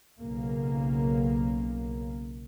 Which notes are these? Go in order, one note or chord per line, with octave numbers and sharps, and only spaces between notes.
B1 C#3 A#3